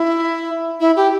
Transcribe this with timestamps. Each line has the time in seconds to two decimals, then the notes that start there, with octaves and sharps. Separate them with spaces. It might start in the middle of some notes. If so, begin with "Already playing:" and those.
Already playing: E4
0.80 E4
0.96 G4